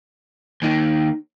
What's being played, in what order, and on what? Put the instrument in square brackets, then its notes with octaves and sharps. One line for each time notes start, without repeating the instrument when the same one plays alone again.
[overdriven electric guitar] D#2 D#3 [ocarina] D#4